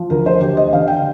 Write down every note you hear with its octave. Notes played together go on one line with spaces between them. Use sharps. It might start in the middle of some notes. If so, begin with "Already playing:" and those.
Already playing: F3
D2 A#4
C5
D2 G4
D#5
D3 F5
G5